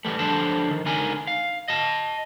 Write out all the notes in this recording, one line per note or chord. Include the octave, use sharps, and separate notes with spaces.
E3 G3 A3
F3 G3 D4 A4 C5 A5
D#3
C#2 D3 D#4 A#4 G#5
F5
D#5 A5